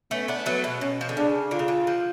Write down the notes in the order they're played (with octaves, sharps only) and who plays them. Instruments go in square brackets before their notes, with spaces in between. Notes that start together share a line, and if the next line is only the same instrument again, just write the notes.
[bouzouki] A3 C#4 [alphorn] B3
[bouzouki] B3 D4
[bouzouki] F#3 A3 [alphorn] B3
[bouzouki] B2
[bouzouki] B2 [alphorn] C#4
[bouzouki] F3
D3
[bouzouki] C#3 [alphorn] D4
[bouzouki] D3 [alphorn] F4
[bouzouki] C#3
D3
F3